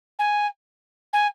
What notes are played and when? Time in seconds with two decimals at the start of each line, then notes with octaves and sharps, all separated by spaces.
0.19 G#5
1.13 G#5